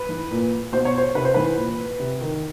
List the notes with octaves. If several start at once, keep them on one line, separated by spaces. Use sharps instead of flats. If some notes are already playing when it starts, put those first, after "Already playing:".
Already playing: B4
E3
A#2
B2 C5
C#5
C5
C3 B4
C5
E3 B4
A#2
C3
D#3